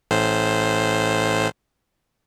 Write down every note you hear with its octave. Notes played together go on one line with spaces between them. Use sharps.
A1 A2 C5